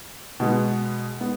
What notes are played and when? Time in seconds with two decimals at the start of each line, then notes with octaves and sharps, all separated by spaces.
0.40 B2 G#3 B3
1.21 G#3 B3